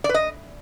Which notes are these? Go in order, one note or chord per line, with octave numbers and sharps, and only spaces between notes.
D5
B4
D#5